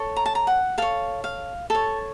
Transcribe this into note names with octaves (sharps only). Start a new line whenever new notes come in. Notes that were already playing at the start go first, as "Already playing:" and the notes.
Already playing: A4 C#5
A#5
A5
A#5
F#5
A4 C#5 F5
F5
A4 C#5 A5